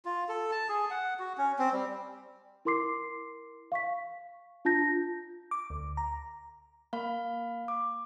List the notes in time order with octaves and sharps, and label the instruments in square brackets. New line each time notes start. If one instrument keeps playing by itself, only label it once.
[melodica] F4
A4
A5
G#4
F#5
F#4
C#4
C4
G3
[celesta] E4 A#4 C6 D6 C7
F5 C#6 B6
D4 F4 A5 G6 A#6
[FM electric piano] D6
D2
A#5
[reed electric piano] A#3 [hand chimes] F5 B5
[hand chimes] D6